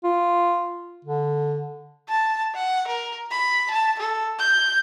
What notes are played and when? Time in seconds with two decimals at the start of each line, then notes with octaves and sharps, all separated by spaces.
0.04 F4
1.05 D3
2.09 A5
2.55 F#5
2.88 A#4
3.32 B5
3.71 A5
3.99 A4
4.40 G6